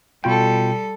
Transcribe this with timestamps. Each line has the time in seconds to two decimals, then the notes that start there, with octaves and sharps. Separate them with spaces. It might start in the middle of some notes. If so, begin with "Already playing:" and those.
0.24 B2 G3 F4 A4 G5